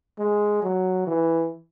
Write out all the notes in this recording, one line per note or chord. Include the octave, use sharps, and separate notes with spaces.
G#3
F#3
E3